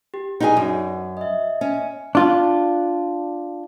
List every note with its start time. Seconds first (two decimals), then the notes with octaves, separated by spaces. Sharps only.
0.14 G4
0.40 D#4 E4 G#4 B4 D5 F#5
0.57 F#2
1.17 D#5 E5
1.61 C#4
2.15 D4 F4